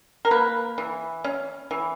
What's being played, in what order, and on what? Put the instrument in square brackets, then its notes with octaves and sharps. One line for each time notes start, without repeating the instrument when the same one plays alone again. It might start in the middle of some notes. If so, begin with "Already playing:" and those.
[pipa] A#4
A#3 B4
E3
C#4
E3